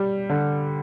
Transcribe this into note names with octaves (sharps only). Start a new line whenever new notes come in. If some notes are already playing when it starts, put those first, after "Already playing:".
Already playing: G3
D3